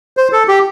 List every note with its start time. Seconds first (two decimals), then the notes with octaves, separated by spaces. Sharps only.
0.17 C5
0.32 A4
0.48 G4